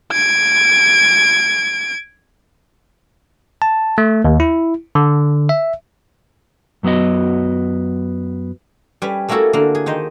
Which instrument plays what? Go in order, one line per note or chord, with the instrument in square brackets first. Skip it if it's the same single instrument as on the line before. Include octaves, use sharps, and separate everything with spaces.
[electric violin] G#6 D7
[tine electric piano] A5
A3
D#2
E4
D3
E5
[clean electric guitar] F#2 F#3 B3 F#4 D#5
[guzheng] G3 C#4 B4
A3 A#3 C#4 E4 F#4 A4
D3 A#3
G#4
D#3 D#4 C5 D#5